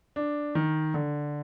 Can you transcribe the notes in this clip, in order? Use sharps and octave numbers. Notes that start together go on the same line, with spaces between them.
D4
D#3
D3